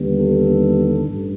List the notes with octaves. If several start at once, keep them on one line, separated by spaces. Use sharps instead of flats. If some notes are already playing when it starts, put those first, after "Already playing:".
Already playing: D#2 D3 G3 B3
A4
A1 G2